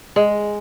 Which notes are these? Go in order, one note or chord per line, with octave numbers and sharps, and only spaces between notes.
G#3